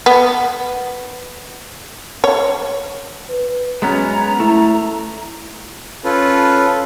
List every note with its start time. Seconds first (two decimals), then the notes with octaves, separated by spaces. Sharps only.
0.06 B3
2.24 C#5
3.30 B4
3.82 F#2 G#3 B3 C#4 A#5
4.40 A3 E4
6.04 C#4 F4 A4 B4